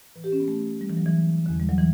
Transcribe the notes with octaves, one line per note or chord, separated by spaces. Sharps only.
A2 E3 B4
G4
C#4
B3
A3
G3
E3
F#3
E3
E2 D3
G3
F#3
E3